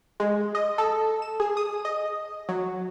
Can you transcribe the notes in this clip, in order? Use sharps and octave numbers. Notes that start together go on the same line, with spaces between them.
G#3
D#5
A4
E7
G#4
D#6
D#5
F#3